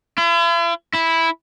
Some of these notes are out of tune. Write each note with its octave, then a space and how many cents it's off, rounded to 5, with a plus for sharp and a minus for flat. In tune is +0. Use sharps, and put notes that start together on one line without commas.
E4 +45
E4 -5